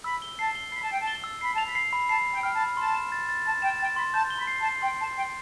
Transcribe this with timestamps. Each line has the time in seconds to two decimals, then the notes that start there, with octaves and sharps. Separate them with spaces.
0.04 B5 E6
0.22 G7
0.39 A5 C7
0.55 G7
0.72 B5 C7
0.82 A5
0.90 G5 C7
1.00 A5
1.08 G7
1.24 E6
1.41 B5 C7
1.54 A5 F7
1.66 B5
1.75 C7
1.93 B5
2.09 A5 C7
2.26 C7
2.31 G5
2.43 G5 F6
2.54 A5
2.60 B5
2.77 A5 C6
2.94 E7
3.12 A6
3.29 A6
3.45 A5 A6
3.62 G5 E7
3.80 G5 A6
3.96 B5 C6
4.13 A5 G6
4.30 G7
4.37 B5
4.47 C7
4.60 A5
4.66 C7
4.82 G5 C6
4.99 A5 C7
5.16 G5 C7